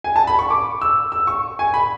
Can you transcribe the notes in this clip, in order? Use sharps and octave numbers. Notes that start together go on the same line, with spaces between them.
G#5
A5
B5
C#6
D6
E6
E6
C#6
G#5
B5